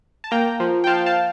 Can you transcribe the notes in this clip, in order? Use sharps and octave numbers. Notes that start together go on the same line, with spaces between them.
A5
A#3 G5 A#5
F3
G5
F3 F5 A5
F5 A5